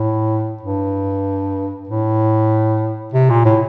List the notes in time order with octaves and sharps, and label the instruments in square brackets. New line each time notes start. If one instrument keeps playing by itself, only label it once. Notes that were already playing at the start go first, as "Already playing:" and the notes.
Already playing: [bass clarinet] A2
G2
A2
C3
A#2
A2